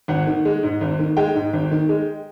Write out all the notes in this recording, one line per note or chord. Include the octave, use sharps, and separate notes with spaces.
G#1 F#5
D#3
G#3
G#2
G#1
D#3
G#3 G5
G#2
G#1
D#3
G#3